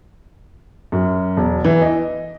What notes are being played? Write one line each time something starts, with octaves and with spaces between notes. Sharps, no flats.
F#2
E1
E3
D#5